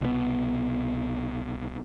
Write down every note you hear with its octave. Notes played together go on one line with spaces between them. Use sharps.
C2 B2 G#3 B3